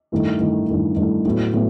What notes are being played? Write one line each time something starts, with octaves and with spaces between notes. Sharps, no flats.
G2 D#3 A3 E4
G2 D#3 A3 E4
G2 D#3 A3 E4
G2 D#3 A3 E4
A2 F#3 B3 E4
A2 F#3 B3